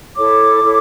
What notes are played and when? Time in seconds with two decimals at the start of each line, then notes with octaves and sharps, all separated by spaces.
0.16 E4 A4 C#5 D6
0.62 E4 A4 C#5